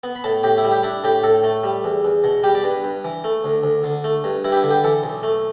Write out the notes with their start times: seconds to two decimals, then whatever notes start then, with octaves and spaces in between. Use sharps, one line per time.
0.03 B3
0.15 B5
0.24 A2 A5
0.43 A2 G4
0.58 E4
0.64 G3
0.71 G4
0.83 D4 E4
1.04 A2 G4
1.24 A2 A4
1.44 A3
1.63 G3
1.84 E2
2.05 E2
2.24 B2
2.43 G3 G4
2.55 D5
2.64 G2 B4
2.84 G2
3.05 E3
3.24 A3
3.44 D2
3.63 D2
3.84 D3
4.04 A3
4.24 G2
4.44 G2 E4
4.52 G4
4.57 E4
4.64 D3
4.70 G4
4.84 E3 A4
5.03 B1
5.23 A3